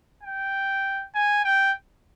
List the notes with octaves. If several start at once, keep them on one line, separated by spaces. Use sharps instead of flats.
G5
G#5
G5